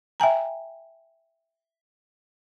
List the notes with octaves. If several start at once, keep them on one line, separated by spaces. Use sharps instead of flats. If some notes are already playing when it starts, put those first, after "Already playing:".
E5 G5 G#5 A#5